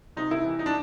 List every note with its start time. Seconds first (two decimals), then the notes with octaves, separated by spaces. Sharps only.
0.17 C3 D#4
0.31 E4
0.44 E3
0.59 D#4
0.66 D4